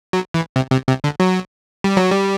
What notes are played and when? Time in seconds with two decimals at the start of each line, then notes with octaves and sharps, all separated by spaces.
0.13 F#3
0.34 E3
0.56 C3
0.72 C3
0.88 C3
1.04 D3
1.20 F#3
1.84 G3
1.97 F#3
2.12 G3